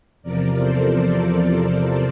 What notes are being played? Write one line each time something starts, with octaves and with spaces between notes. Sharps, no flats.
E2 C3 F3 A#4 D5
A4 C5